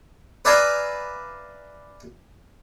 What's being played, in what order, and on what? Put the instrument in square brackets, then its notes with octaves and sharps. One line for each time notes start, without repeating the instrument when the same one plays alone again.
[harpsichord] B4 D5 E5 F5 G#5 A#5